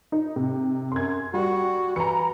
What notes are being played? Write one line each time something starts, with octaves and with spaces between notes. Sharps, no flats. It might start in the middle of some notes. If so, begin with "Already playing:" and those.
D#4
C3
F#2 C6 G#6
G3 F#4
E3 A#5 C#7